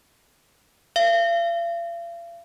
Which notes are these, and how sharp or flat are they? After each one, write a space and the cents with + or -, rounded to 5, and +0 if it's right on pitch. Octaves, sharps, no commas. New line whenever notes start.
F5 -40